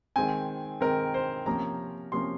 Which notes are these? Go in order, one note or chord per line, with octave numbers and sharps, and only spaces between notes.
D#3 G#3 C4 G#5
D#3 G#3 C4 A#4
C5
C3 F3 A#3 C#4 A#5
C3 F3 A#3 C#4 C6